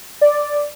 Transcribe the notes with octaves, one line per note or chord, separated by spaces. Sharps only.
D5